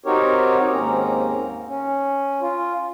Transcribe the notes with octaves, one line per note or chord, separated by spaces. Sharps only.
C4 D#4 F#4 G4 A#4 C#5
D#2 G#2 A#3 C4 C#4 A#5
C#4
F4